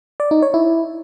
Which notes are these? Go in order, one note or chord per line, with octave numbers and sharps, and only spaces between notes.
D5
D#4
C#5
E4